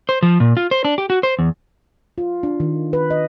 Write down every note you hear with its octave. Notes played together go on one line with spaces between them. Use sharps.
C5
F3
A#2
F4
C5
D4
G4
F#4
C5
E2
F4
D4
D#3
B4
D#5